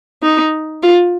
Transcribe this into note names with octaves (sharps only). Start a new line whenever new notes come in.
D#4
F4